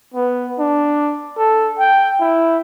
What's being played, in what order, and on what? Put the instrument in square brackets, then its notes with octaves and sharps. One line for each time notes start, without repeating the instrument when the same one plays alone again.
[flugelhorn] B3
D4
A4
G5
E4